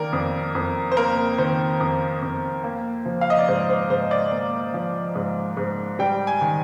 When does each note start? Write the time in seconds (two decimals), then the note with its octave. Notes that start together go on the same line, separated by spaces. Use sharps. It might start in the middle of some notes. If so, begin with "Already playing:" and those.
Already playing: D#3 A#3 A#4 D5
0.13 F2
0.55 F2
0.92 C5
0.97 A#3 A#4
1.38 D#3 C5
1.81 F2
2.22 F2
2.64 A#3
3.05 F3
3.21 F5
3.30 D#5
3.39 D5
3.48 G#2 C5
3.69 C5
3.90 G#2 C5
4.11 D5
4.32 A#3
4.74 F3
5.16 G#2
5.57 G#2
5.99 G3 G5
6.27 G#5
6.41 D#3